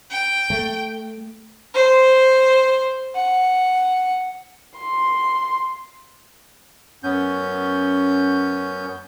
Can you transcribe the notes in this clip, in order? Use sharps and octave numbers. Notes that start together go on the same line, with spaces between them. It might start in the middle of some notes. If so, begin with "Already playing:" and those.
G5
A3
C5
F#5
C6
F#2 B3 C#4 G6